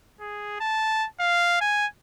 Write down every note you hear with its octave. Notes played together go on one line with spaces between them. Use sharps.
G#4
A5
F5
G#5